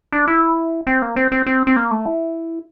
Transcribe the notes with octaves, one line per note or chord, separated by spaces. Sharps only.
D4
E4
C4
A#3
C4
C4
C4
C4
A#3
A3
E4